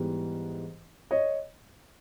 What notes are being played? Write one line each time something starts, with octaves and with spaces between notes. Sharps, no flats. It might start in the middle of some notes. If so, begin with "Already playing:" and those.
Already playing: G#2 E3 G3 B3
C#5 D#5